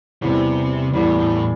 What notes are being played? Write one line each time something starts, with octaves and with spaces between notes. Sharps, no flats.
E2 C3 E3 G3
E2 A2 E3 G3
A2